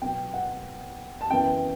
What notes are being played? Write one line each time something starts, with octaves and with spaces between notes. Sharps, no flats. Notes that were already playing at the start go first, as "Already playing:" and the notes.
B2 F#3 B3 G5
F#5
A5
F#2 E3 B3 E4 G5